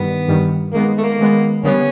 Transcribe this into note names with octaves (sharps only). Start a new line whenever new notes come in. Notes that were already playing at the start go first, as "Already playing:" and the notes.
Already playing: G2 D#3 G3 B3
G2 D#3 G3
D#3 G#3 A#3 B3
A3
A#3
D#3 G#3 B3
D3 G3 A#3 B3 C#4